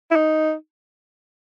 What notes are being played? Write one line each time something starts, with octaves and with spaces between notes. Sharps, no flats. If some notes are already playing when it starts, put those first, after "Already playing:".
E4
D#4